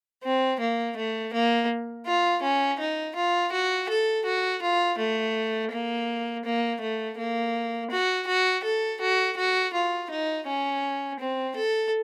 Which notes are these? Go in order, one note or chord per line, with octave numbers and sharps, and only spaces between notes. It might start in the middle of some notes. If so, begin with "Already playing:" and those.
C4
A#3
A3
A#3
F4
C#4
D#4
F4
F#4
A4
F#4
F4
A3
A#3
A#3
A3
A#3
F#4
F#4
A4
F#4
F#4
F4
D#4
C#4
C4
A4